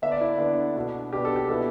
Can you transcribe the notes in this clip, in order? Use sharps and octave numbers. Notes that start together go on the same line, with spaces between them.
D3 B3 D4 E5
D5
E4
D3 B3 D4
B2 B3 D4
B2 B3 D4 G4
A4
G4
B2 B3 E4 A4